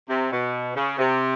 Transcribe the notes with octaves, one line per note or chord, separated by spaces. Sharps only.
C3
B2
C#3
C3